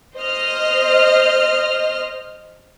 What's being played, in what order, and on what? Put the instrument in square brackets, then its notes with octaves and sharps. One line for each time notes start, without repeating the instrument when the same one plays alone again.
[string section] C5 D#5 F6